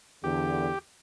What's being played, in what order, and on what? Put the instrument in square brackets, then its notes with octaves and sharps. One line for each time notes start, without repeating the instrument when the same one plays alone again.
[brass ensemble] E2 D3 [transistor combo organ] G4